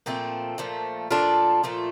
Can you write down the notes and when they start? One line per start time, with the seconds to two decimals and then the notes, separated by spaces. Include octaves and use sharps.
0.06 A#2 F3 A3 C4
0.58 A#2 F3 A3
1.11 A#2 F3 A3 D4 F4
1.64 A#2 F3 A3